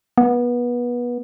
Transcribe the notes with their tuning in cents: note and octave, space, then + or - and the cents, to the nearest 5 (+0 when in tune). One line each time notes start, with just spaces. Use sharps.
B3 -25